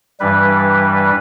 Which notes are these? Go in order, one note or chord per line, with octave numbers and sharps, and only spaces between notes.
G2 E3 G3 B4